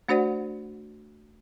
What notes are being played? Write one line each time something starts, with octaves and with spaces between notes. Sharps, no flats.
A3 D4 F#4 C5 D5 F#5